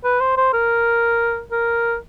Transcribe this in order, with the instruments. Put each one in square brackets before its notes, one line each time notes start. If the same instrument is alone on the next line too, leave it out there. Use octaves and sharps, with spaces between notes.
[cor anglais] B4
C5
C5
A#4
A#4